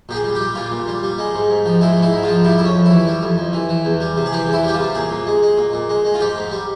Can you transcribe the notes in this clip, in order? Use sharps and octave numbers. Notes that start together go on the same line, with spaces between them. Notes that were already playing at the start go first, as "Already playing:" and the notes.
A#2 G4
G#4
G3
G4
G3
A#2 F4
A#2
G3
G3
G#3
G#2
G#2
F3
G#3 E4
G#2
E4
G#2
F3 F4
G3 E4
F2 E4
C#4
F2
E4
E3
G3
F2
F2
E3
E3
E2
G3
C3
G#4
E3 G4
E2
E4
G3 G4
F4
C3
A#2 G#4
A#2
G#3
G#3
A#2
A#2
G#3
G#3
F4
G#2 G4
G#2
G3